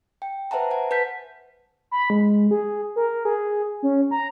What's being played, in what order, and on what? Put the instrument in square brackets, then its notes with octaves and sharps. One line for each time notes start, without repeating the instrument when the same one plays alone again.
[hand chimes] G5
B4 C5 E5 F#5 A5 A#5
F#5 G#5
B4 A5 G6 B6
[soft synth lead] B5
G#3
G#4
A#4
G#4
C#4
A#5